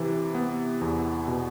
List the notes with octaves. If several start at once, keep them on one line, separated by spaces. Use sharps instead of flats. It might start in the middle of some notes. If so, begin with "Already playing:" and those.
Already playing: C3 E3
B3
E2
B2